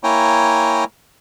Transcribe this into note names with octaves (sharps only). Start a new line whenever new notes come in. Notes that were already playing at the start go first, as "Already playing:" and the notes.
A#3 E4 C#5 G5 G#5 A#5